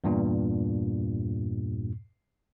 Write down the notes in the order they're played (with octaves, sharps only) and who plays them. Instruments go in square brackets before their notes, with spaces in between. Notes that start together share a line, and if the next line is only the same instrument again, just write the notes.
[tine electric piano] E2 G2 A#2